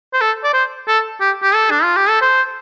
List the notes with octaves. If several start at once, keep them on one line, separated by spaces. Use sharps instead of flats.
C5
A4
D5
C5
A4
G4
G4
A4
D4
F4
G4
A4
C5